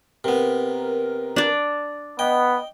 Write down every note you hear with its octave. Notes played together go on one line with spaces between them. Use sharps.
C3 B3 A#4
D4 D5
B3 D#5 G5